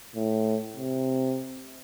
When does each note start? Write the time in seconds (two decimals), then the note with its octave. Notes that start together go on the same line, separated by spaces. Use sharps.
0.16 A2
0.76 C3